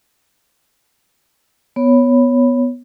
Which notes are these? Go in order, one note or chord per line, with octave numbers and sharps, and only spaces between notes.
B3 C#5 B5